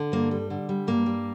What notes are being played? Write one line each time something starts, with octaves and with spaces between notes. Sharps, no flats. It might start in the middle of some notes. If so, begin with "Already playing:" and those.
Already playing: D3
G2 A#3
G3
D3
G3
G2 A#3
G3